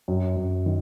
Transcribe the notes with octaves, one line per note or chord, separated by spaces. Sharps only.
F#2
F#2
D#3